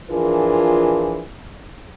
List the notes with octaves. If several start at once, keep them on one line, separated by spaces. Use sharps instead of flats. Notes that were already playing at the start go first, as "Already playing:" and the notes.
E3 F3 D4 F4 G#4 A#4